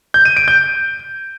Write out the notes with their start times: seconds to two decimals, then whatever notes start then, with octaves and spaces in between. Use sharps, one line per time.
0.14 G6
0.25 D#7
0.37 D7
0.48 G6